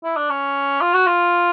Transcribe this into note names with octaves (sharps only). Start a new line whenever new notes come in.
E4
D4
C#4
F4
F#4
F4